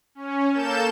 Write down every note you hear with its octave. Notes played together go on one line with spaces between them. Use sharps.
C#4
A#3 A4 A5 G6 E7